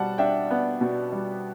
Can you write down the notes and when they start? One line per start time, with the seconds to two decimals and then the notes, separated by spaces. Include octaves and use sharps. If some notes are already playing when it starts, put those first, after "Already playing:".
Already playing: B2 G3 F#5 A5
0.18 D4 E5 G5
0.51 B3
0.81 B2
1.13 G3